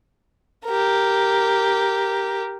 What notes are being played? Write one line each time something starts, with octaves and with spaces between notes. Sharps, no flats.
G4 A#4